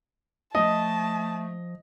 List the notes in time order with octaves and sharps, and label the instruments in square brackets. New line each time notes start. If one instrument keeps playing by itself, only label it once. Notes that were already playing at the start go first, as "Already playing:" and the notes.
[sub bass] F3 [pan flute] A3 [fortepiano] D#5 [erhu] A5